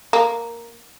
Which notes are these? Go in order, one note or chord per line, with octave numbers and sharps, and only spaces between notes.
A#3